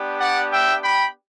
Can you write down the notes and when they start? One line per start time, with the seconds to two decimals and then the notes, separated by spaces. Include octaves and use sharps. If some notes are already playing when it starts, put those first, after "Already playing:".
Already playing: B3 D4 G4
0.20 D5 F#5
0.51 E5 G5
0.83 G5 B5